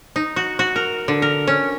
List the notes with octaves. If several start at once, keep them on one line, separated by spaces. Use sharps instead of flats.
D#4
F#4
F#4
A#4
D3
A#4
C#4